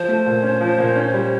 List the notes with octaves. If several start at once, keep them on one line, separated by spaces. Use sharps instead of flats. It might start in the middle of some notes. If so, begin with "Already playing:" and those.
Already playing: F3 C5
A3
A#2
C#4
F3
A#2
C#4
G3